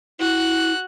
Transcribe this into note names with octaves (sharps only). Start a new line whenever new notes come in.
E4 F#4 F#6